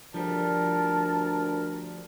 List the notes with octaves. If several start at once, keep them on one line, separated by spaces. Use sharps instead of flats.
D2 F3 G3 A#4 A5